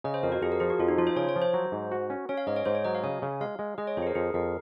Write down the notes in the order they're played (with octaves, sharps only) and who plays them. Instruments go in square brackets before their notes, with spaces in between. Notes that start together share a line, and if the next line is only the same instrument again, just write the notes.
[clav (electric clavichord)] C#3 [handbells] D#5
[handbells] C5
[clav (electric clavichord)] F2 [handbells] A#4
[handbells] F#4
[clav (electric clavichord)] F2 [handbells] G#4
[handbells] A#4
[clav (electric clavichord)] F3 [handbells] G#4
[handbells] F#4
[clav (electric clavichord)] F2 [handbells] F4
[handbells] D#4
[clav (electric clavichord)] F3 [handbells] F4
[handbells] C5
[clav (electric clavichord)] C#3 [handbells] C#5
[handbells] C#5
[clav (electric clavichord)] F3
[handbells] C5
[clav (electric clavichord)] F#3
G#2
F#4
C#4
[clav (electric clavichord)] C#4 [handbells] C#5
[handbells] F5
[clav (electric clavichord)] G#2 [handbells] D#5
[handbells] C#5
[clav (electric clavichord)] G#2 [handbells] C5
[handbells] C#5
[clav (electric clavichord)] F#3 [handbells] D#5
[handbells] F5
[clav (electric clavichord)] C#3 [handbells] G#5
[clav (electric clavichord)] C#3
[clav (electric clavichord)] G#3 [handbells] F5
[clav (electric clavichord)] G#3
[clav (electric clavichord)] G#3 [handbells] D#5
[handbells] C#5
[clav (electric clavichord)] F2 [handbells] C5
[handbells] G#4
A#4
[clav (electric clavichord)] F2 [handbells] G#4
[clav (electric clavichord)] F2 [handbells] A#4